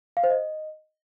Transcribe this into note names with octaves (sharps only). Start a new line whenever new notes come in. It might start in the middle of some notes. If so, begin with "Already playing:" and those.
F5
C5
D#5